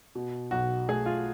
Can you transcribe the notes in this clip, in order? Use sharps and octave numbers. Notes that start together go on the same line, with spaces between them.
B2
B1 F#4
A3 G#4
F4